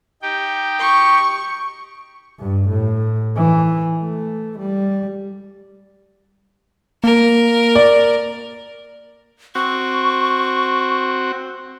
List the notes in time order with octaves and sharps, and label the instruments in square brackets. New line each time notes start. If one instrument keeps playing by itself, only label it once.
[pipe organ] D#4 G4 G5
[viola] C#6
[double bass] G2
A2
E3
A3
G3
[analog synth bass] A#3 [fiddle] A#4
[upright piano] D5
[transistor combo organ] C4 F#4 [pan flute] C#6